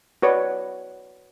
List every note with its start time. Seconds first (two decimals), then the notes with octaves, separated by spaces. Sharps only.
0.22 F#4 B4 C#5 D5